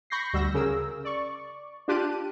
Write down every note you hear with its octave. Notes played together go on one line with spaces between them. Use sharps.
B5 C#6 G6 A#6 C7
D2 G3 F#4 E6 G6 A#6
C#3 G#4 A#4 E6
D5 C#6
D4 F4 G4 A5 F#6 D#7